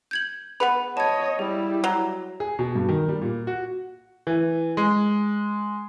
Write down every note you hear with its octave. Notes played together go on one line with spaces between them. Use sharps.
G6 G#6 F#7
B3 G#4 B4 F#5
C#5 D#5 A5 G#6
G3 E4 G#4
F#3 A#5
G#4
B2
G2
D#3
G3
A#2
F#4
E3
G#3